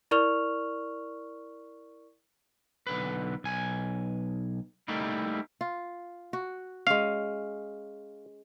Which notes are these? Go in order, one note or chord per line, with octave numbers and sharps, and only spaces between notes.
E4 A#4 D5 C#6 F6 F7
B1 D3 B4
B1 G#5
G3 A3 A#3 D#4 E4
F4
F#4
G#3 C#4 F5